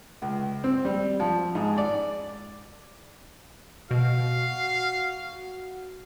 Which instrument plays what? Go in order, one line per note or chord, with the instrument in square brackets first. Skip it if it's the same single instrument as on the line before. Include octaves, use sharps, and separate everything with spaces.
[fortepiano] C#2
C4
G3
F3
G#2
D5
[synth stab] B2 [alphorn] F#4 [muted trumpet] F5